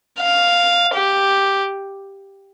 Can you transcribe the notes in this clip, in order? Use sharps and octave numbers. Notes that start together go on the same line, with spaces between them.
F5
G4